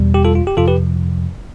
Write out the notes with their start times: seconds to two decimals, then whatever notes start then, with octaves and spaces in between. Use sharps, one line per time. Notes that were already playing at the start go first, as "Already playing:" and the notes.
Already playing: E2 B2 G3
0.14 G4
0.25 F4 A4
0.35 F4
0.47 G4
0.57 F2 C3 F3 F4 A4
0.68 G4 B4